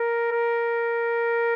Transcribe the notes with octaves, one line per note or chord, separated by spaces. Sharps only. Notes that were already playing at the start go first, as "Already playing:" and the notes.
Already playing: A#4
A#4